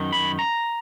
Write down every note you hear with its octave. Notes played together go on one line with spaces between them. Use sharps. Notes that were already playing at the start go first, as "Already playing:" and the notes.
Already playing: F#2 D#3
B5
A#5